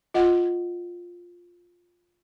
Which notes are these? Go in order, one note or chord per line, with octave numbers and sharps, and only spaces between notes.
F4 D#5 F#5